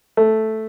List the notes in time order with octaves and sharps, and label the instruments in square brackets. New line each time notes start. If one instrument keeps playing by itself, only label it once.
[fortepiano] A3